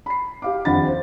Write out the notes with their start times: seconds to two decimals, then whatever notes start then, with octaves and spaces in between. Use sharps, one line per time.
0.06 B5 C7
0.42 G4 F5 D6
0.65 D#1 F2 D4 F#5 B5 A6
0.87 C5